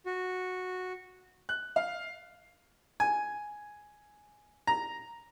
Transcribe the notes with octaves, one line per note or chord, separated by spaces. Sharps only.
F#4
F#6
F5
G#5
A#5